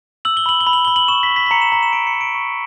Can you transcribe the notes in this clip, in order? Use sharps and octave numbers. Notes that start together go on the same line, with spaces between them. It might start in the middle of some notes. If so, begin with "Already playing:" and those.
E6 F#7
G7
B5 F#7
G7
B5
F#7
B5 G7
F#7
C#6 E7
B6
C#6
B6
B6
A#5 C#7
E7
A#5 F#7
E7
A#5 D7
C#7
A#5 E7
D7
C#6